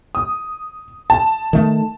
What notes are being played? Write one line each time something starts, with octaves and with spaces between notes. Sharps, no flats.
D#6
A5
D#3 A3